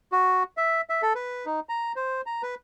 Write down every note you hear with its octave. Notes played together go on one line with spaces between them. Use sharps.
F#4
E5
E5
A4
B4
D#4
A#5
C5
A#5
B4